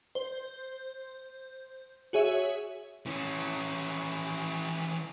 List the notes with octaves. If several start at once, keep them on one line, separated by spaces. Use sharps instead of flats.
C5
F#4 G#4 C#5 E5
E3 C#4